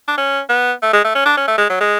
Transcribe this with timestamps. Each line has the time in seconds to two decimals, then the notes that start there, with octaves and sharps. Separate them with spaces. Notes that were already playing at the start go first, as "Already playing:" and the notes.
0.08 D4
0.18 C#4
0.49 B3
0.82 A3
0.93 G#3
1.04 A3
1.15 C#4
1.26 D4
1.37 C#4
1.48 A3
1.58 G#3
1.70 F#3
1.81 G#3